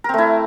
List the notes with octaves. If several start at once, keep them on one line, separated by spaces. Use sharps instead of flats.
A3 C4 E4 A#4